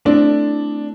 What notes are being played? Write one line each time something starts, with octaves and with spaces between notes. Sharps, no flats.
A3 C4 D4 E4